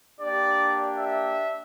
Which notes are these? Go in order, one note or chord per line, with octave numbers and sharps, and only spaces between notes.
A#3 D4 G4 D5
E5